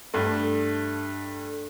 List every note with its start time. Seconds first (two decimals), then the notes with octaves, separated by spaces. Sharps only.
0.14 G2 A3